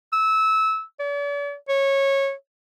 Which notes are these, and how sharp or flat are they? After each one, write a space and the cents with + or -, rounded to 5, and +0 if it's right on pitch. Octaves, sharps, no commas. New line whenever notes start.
E6 -20
D5 -45
C#5 -15